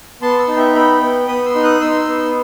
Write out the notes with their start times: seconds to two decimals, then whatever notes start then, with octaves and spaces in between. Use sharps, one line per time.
0.22 B3 A5 C6
0.39 C6 E6
0.48 D#4
0.57 E5 G5
0.75 B3 G5 B5
1.02 B3
1.27 B3 B5 D#6
1.45 C6 E6
1.55 D#4
1.63 D#6 F#6
1.81 D#4 C6 E6
2.07 B3